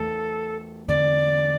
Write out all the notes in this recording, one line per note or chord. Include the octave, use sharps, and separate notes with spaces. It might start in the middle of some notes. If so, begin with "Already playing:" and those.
Already playing: E2 E3 A3 A4
E2 D3 A3 C4 D5